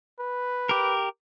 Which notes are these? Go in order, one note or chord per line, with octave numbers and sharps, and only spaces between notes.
B4
G4 A#4